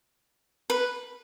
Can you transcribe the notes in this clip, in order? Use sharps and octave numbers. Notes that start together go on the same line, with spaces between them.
B4